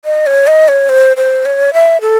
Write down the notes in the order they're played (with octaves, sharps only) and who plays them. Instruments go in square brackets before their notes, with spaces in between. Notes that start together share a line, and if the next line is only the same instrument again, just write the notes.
[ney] D#5
C#5
D#5
C#5
C5
C5
C#5
E5
A4